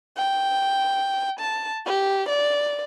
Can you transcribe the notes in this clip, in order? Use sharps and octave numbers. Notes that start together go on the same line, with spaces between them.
G5
A5
G4
D5